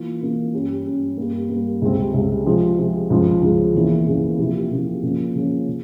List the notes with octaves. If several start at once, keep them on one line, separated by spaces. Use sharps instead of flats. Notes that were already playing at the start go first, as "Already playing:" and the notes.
Already playing: E3 A#3 F4
E3 A#3 F4
G2 G3 C#4
G2 G3 C#4
G2 G3 A#3
G2 G3 A#3
C#2 C3 G3 C4
C#2 C3 G3 C4
C3 F3 G#3
C3 F3 G#3
C#2 C#3 F3
C#2 C#3 F3
E2 C#3 E3 A#3 E4
E2 C#3 E3 A#3 E4
C3 F3 A#3 E4 G4
C3 F3 A#3 E4 G4
C#3 F3 A#3 C#4
C#3 F3 A#3 C#4
C#3